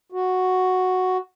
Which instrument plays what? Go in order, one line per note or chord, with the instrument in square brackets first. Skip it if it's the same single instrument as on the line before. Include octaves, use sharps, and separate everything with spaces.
[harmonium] F#4